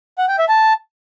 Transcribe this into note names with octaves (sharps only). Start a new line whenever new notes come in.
F#5
G5
E5
A5